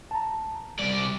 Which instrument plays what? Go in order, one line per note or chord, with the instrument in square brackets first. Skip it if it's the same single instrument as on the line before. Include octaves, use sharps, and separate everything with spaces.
[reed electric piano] A5 A#5
[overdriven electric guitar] C2 D5 [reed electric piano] G3